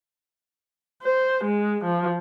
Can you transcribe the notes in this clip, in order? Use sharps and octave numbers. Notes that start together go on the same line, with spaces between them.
C5
G#3
F3